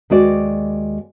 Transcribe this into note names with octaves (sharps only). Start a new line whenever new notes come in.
D#2 G#3 F#4 D5